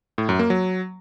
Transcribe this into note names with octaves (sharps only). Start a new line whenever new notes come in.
A2
F#2
A#3
F#3